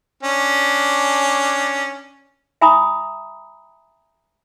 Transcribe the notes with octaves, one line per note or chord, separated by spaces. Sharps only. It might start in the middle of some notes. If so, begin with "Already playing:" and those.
C#4 D4
E5 G#5 A#5 B5 D#6